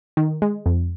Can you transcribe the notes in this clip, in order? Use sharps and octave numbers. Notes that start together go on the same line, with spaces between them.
D#3
G#3
F2